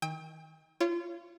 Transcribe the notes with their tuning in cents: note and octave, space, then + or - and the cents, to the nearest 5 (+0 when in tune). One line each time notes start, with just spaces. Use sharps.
D#3 +25 G5 +30 E6 -45
F4 -30 C#5 +0